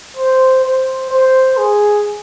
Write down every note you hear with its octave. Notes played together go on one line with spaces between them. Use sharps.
C5
C5
C5
G#4